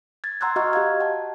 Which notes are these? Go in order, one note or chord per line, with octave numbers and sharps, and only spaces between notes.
G#6 A6
F#5 A#5 C6 E6 F#6 G#6
F#4 D#5 F#5 A#5 C#6 F6
G4 D#5 F5 G#6
F#5 A5